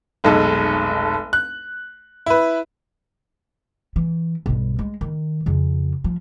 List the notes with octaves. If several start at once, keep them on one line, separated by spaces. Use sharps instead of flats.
F1 B1 G#3 A4
F#6
E4 B4
E3
B1 G2
G#3
D#3
F2 C#3
F3